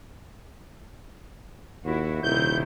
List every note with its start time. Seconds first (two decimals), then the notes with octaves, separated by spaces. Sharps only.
1.84 D#2 E4 F#4
2.23 D#1 C3 D#3 E4 G6